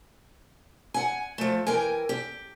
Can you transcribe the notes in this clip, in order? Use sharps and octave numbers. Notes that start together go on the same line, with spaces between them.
F#5 G#5
F3 A3
E3 A#4 G5 G#5
G4